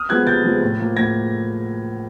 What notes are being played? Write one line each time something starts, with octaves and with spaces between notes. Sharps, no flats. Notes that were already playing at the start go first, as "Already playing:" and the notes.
Already playing: D#6 F6
F3 G#3 B3 F#6 G#6
C3 G6 A6
F3 G#3 B3
A2
F3 A#3
A2 G#6 A#6